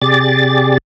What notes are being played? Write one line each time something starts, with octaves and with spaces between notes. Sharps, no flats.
C3 G4 G#4 D5 A6